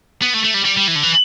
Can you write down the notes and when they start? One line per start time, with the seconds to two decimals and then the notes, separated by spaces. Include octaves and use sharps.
0.22 B3
0.34 A3
0.44 A3
0.54 G3
0.65 G3
0.77 G3
0.88 E3
0.96 D3
1.03 E3